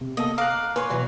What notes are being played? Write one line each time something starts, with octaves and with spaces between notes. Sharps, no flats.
C3
A#3 B3 A4 D#5
F5 A#5 D6 F#6
B4 C#5 G#5 C6
B2 E3 F#3